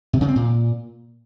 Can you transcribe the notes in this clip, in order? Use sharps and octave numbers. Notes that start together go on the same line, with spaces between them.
C3
C#3
C4
A#2